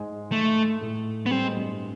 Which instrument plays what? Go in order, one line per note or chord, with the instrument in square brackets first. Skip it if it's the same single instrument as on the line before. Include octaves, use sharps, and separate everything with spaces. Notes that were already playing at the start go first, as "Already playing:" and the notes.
Already playing: [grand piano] G#2 G#3
[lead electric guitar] A3
[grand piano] A2 A3
[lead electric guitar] B3
[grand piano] G3 [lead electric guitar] C4
[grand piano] G#3
G2 G3